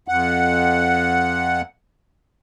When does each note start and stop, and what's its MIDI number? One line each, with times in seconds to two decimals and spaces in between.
0.08 1.61 41
0.08 1.61 78